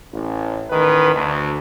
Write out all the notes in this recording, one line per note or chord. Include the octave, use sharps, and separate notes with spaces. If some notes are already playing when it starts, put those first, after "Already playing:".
A1
A1 D#3 B4
D2